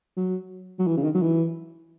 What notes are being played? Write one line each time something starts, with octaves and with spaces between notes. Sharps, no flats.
F#3
F#3
E3
C#3
D#3
F#3
E3